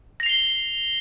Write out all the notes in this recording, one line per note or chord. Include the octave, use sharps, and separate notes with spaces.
A#6 C7 F7 G7